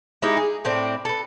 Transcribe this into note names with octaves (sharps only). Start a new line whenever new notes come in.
G#3 D#4 E4 G4
G#4
A2 C4 D4
A4 B4